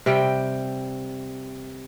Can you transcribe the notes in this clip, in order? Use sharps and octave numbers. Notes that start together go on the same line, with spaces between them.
C3 G3 G5